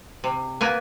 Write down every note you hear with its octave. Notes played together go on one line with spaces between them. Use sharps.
C3
A#3 B3 G#5